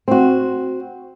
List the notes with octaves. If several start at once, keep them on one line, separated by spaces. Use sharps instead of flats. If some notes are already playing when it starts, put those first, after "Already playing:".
C4 F#4